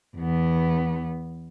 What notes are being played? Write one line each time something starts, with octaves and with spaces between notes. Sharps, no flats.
E2 B3